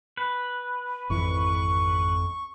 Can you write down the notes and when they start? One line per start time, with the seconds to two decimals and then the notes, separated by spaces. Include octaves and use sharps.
0.17 B4
1.10 G#1 F2 E3 C#6